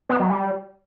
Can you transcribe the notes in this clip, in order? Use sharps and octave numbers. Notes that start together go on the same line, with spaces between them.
B3
F#3
G3